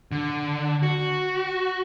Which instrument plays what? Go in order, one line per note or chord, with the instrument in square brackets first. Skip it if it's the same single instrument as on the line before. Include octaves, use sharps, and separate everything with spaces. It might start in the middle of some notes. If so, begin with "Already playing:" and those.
[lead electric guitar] D3
F#4